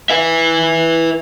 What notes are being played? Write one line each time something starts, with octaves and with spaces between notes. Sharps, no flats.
B4 E5